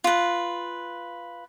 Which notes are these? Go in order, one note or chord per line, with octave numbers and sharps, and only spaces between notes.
F4 B4